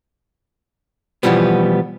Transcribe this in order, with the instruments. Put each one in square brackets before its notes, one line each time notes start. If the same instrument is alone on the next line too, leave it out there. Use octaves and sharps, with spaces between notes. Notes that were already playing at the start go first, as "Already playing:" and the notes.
[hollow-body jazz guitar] B2 E3 F3 G3 B3